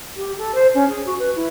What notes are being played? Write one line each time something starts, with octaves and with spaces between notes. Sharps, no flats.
G4
A4
C5
C#4
G#4
F#4
B4
E4